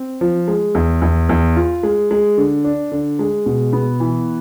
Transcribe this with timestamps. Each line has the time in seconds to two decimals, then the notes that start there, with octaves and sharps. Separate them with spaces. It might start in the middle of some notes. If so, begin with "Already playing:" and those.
Already playing: C4
0.21 F3
0.48 G#3
0.75 E2
1.02 E2
1.29 E2
1.56 F4
1.83 G#3
2.11 G#3
2.37 D3
2.64 D4
2.92 D3
3.19 G#3
3.46 B2
3.73 B3
4.00 E3